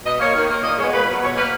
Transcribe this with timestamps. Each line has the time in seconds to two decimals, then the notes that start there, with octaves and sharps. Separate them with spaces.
0.05 B2 D#5
0.19 A#3 C#5
0.35 D#3
0.49 A#3
0.63 A#2 D#5
0.78 G#3 B3 C#5
0.93 A#2 B4
1.07 F#3 B3
1.22 B2 C#5
1.36 A#3 B4